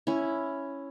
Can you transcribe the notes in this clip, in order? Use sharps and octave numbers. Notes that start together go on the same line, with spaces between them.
C#4 E4